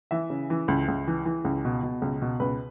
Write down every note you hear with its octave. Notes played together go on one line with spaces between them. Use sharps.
E3 E5
C#3
E3
C#2
C#2
E3
E3
C#2
B2
B2
C#2
B2
C#2 B4